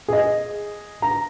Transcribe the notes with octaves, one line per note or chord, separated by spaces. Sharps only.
G#4 D#5
A#5